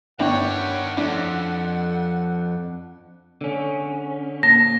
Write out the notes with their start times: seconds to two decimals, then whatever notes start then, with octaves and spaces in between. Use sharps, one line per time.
0.19 G1 D#3 D4 C#5 F#5 G5
0.97 F2 D4
3.41 D3 C#4
4.43 A#2 A5 A#6